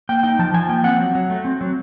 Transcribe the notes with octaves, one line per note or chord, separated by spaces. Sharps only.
A#3 G5
D#4 G5
F3 A5
F3 G#5
A#3 G5
C4 F#5
F#3
F#3
A3
C4
F#3